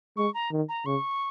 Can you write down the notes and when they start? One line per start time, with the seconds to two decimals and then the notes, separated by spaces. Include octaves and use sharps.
0.17 G#3 C#6
0.34 A#5
0.52 D#3
0.69 A#5
0.86 C#3 C#6